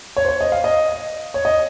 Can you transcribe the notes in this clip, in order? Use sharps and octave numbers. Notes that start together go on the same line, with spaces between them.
C#5
C5
C#5
D#5
F5
D#5
C#5
D#5